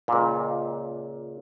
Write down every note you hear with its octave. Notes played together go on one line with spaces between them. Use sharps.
C#2 A#2